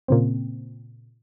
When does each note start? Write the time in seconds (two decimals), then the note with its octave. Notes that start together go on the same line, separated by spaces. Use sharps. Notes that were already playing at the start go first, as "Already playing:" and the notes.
0.08 A#2 C#3 C4